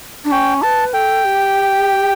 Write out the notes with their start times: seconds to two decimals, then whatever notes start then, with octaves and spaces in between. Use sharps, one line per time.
0.25 D4
0.31 C#4 G5
0.63 B4 A5
0.94 A4 G5
1.25 G4